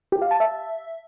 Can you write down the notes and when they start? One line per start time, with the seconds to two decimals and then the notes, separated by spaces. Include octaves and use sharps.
0.12 G4
0.22 F5
0.31 A5
0.40 E5